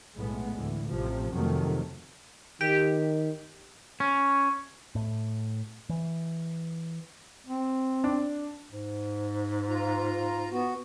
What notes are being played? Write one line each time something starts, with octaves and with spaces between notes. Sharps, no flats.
B1 A2 G#3 B3
D2 A2 E3
A1 C3 F3
F2 C3 D#3 F#3 A3
D#3 G4
C#4
A2
E3
C4
D4
G#2
F4 A#5
B3 F#4